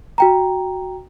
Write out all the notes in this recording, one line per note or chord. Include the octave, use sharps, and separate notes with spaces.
F#4 G5 A#5